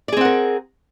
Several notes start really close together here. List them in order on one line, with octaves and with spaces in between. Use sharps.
D5 G#4 C4 F#5 A#4